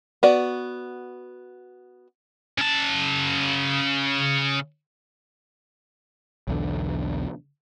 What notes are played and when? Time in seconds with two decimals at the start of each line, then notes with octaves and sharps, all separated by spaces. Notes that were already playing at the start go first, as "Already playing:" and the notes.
0.23 B3 F#4 D5
2.58 C#3 A5
6.48 B1 E2 D3